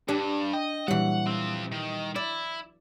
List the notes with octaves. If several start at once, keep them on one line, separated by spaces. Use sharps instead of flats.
G2 D4 G4
D#5 G5
A#2 E3 F#3 G3 F#5
F3 C4
D#3
E4 D5